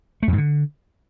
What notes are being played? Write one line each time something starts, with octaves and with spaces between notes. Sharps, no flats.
A3
F2
G#2
D3